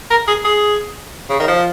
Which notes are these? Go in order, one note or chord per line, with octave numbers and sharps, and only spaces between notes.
A#4
G#4
G#4
C#3
D#3
F3